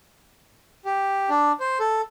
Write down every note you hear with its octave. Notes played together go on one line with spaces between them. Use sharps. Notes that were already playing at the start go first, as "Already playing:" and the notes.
G4
D4
C5
A4